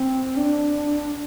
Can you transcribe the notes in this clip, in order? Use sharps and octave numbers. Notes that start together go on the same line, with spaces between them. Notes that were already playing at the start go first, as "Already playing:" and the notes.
Already playing: C4
D4